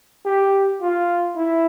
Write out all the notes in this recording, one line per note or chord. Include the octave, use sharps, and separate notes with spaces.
G4
F4
E4